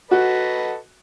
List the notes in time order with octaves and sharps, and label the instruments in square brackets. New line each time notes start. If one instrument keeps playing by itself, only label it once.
[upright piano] F#4 [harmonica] A4 B4 D#5